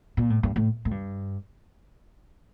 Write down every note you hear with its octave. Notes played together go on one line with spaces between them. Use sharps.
A#2
A2
G2
A2
A2
G2